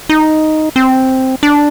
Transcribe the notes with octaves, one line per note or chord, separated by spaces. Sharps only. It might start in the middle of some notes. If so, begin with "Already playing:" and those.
D#4
C4
D4